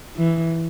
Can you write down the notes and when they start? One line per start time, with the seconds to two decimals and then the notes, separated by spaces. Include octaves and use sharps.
0.17 E3